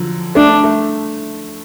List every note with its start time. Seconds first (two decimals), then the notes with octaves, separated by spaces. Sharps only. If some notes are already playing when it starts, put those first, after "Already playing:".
Already playing: D3 F3 F#3
0.35 A3 D4
0.64 A3